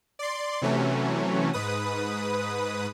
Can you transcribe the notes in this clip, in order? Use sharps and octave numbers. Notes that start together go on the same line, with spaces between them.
D5 C6
C3 E3 F#3 A3 C#4
G#2 B4 D#6